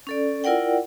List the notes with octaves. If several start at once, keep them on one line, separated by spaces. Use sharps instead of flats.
C#4 A4 D5
E4 F4 A#4 D5 F#5 G5